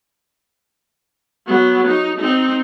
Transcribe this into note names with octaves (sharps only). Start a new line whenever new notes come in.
F#3 B3
D#4
C4 D#4